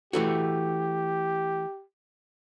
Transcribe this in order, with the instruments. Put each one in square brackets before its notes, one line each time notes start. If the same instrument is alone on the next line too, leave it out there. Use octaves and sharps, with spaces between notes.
[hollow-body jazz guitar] E3 A3 F#4 [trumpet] G4